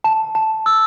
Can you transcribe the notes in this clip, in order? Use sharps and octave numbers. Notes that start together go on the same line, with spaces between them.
A5
A5
E6